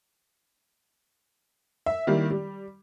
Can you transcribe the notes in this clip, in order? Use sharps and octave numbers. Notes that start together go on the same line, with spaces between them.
E5
D#3 G3 A#3 E4
G3